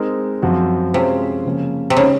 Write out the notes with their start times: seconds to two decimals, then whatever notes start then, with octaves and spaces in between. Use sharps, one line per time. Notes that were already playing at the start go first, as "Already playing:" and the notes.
Already playing: G#3 C4 D#4 A#4
0.42 F#2 F3 C4 F#4
0.93 C3 G#3 C#4 F4 C5
1.45 C#3 F3 A#3 C#4
1.90 C3
1.97 C#3 G#3 C4 D#4